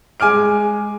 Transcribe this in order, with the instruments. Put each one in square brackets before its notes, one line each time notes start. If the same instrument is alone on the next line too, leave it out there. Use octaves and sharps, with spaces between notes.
[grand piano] G#3 G#5 D6 F6 D7